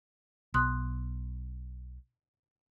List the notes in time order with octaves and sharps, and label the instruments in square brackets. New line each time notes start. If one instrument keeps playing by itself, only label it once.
[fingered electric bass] B1 [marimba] C6 D#6 F#6